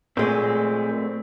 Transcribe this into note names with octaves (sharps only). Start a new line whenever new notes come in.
A#2 G#3 A3 C4